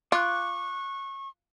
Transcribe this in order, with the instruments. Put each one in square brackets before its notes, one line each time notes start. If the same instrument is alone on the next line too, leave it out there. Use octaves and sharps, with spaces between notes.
[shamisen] F4 [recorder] C#6 [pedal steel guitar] D6 F#6